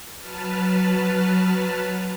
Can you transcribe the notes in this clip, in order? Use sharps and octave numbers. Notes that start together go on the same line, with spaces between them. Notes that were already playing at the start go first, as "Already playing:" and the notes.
F#3 B4 A5 F6